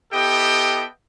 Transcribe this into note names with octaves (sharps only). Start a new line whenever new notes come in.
B3 E4 G4 A4 D#5 G5